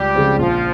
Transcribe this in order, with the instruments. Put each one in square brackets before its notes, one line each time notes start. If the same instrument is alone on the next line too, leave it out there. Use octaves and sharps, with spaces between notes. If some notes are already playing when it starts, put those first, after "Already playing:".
Already playing: [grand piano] C#2 [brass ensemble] G3 G4
[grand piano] C#3 F3 G#3 C4
[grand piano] A#1 [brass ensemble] F3 F4